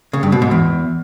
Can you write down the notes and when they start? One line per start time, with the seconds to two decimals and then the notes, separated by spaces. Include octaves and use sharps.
0.13 C#3
0.23 G2
0.32 B2
0.42 G#2
0.51 E2